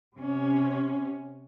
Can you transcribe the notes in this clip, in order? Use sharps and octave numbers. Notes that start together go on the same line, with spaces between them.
C3 C#4